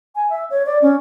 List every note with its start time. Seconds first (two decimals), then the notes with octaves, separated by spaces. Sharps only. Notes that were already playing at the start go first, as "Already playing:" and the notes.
0.15 G#5
0.30 E5
0.50 C#5
0.66 D5
0.82 C#4